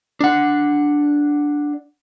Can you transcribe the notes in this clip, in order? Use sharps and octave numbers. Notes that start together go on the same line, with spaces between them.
D4 F#5